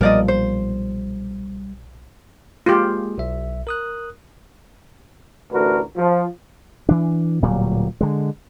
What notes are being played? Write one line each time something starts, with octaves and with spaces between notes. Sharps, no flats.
B1 A#2 F3 G3 A#4 D5 D#5
C5
G#3 A#3 F4 G4 G#4
B1 E5
A#4 D#6 F#6
A1 D2 D4 F#4 A#4 B4
F3
E3 D4
D1 A#2 F#3 G3
D3 G#3